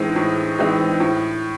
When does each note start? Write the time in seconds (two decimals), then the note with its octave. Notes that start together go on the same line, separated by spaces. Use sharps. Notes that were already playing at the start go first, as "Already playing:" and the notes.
Already playing: A2 E3 G#3 C4 D#4
0.16 A2
0.58 E3 G#3 C4 D#4
1.00 A2